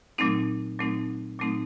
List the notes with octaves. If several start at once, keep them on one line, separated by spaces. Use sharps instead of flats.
A#2 F#3 A3 C4 D#4
A#2 F#3 A3 C4 D#4
A#2 F#3 A3 C4 D#4